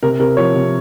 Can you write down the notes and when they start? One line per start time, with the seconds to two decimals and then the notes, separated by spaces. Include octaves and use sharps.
0.03 C3 A#4
0.19 C3 A#4
0.37 F3 C#5
0.54 C3